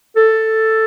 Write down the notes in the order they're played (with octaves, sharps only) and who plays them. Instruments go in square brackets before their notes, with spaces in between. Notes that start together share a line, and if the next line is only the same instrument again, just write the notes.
[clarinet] A4